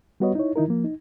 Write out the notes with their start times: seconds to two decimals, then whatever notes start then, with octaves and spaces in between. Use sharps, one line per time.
0.20 G3 B3 F#4 B4 C#5 D#5
0.35 D#4 E4 C#5
0.56 D#3 D#4 E4 A#4
0.68 F3 A#3
0.84 D#4